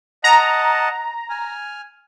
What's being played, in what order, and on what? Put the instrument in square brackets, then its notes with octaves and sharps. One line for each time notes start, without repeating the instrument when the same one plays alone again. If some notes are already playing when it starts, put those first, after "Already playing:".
[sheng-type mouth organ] D#5 F#5 A5 [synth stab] A#5
[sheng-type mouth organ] G#5 F6